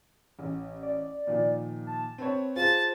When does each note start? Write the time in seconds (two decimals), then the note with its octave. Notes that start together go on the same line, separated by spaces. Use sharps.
0.39 A1
0.82 D5
1.27 A#2 D#3 F3
1.87 A5
2.18 C4 B4 C#5
2.56 F4 G#4 C5 A5 A6